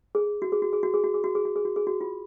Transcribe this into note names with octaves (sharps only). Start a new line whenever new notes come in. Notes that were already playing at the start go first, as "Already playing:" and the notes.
G#4
F#4
G#4
F#4
G#4
F#4
G#4
F#4
G#4
F#4
G#4
F#4
G#4
F#4
G#4
F#4
F4